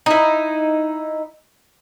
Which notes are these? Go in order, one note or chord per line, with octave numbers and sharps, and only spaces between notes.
D#4 E4